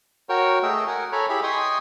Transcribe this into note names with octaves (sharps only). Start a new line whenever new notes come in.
F#4 A#4 C#5 G5
A3 G#4 D#5 G5 E6
A#4 F#5 G#5
A4 C#5 G#5 A#5 B5
E4 G4 G#4 E5 B5
D#5 G5 G#5 C6 C#6 D#6